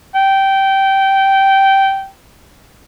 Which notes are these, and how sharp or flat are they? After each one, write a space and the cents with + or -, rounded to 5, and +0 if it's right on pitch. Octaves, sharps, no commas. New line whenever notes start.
G5 -15